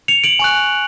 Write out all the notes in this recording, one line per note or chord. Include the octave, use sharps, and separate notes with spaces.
C#7 F7
D7 F#7
G#5 C#6 F#6